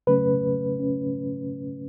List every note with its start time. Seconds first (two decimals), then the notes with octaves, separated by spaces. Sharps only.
0.07 C#3 F#3 A3 C#4 B4
0.80 C#4